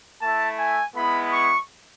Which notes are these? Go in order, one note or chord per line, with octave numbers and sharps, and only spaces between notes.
A3 E4 A5
G#5
G#3 B3 E4 B5
C#6